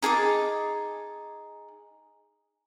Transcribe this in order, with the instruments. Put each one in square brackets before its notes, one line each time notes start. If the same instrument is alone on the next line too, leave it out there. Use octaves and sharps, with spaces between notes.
[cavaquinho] D#4 G#4 A5 D6